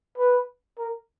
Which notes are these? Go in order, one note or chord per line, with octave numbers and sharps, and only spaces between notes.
B4
A#4